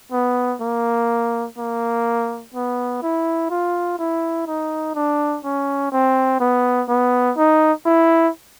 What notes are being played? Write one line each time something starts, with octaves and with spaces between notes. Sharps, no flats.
B3
A#3
A#3
B3
E4
F4
E4
D#4
D4
C#4
C4
B3
B3
D#4
E4